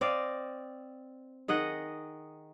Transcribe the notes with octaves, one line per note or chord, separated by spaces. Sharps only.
C4 D5 D#5 F5
D#3 G#4 D#5 F#5